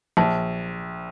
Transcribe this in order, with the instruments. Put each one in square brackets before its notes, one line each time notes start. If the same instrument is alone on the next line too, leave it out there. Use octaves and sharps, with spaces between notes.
[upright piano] A#1 [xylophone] A5